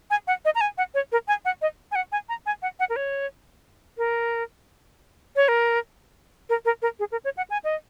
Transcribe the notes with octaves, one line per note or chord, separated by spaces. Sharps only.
G#5
F#5
D#5
A#5
G#5
F#5
C#5
A#4
G#5
F#5
D#5
G#5
F#5
G#5
A#5
G#5
F#5
F#5
A#4
C#5
A#4
C#5
A#4
A#4
A#4
A#4
G#4
A#4
C#5
F#5
G#5
D#5